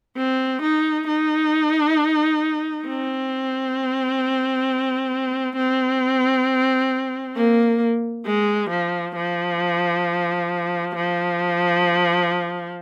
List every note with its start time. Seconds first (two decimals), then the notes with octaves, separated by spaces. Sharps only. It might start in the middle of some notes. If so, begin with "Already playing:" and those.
0.17 C4
0.62 D#4
1.08 D#4
2.87 C4
5.56 C4
7.36 A#3
8.26 G#3
8.70 F3
9.16 F3
10.95 F3